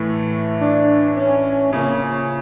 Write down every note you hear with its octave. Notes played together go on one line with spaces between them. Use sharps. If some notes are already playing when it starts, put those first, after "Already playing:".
Already playing: A2 E3 A3
D4
C#4
C#3 F3 A#3 C#4